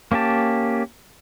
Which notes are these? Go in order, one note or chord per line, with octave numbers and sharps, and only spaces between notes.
A#3 C#4 G4 A5